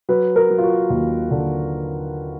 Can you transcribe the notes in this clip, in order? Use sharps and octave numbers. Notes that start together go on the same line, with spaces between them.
F#3 B4
A#4
F#3
F4
F#4
D#2
D3